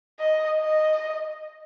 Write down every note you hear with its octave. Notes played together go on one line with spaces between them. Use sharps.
D#5
D#5